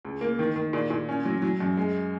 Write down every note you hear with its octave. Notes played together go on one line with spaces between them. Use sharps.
C#2
A#3
D#3
D#3
A#2
A#2
C#4
F#3
F#3
F#2
G#3